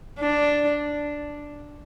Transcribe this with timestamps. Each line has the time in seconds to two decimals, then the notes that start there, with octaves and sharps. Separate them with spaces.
0.20 D4